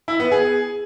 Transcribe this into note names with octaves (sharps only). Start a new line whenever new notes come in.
E4
B3
G#4